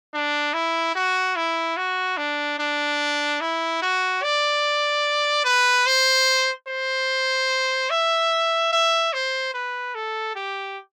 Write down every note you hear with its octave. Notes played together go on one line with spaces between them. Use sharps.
D4
E4
F#4
E4
F#4
D4
D4
E4
F#4
D5
B4
C5
C5
E5
E5
C5
B4
A4
G4